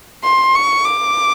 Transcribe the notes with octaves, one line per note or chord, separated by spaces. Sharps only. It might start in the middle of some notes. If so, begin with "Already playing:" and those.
C6
C#6
D6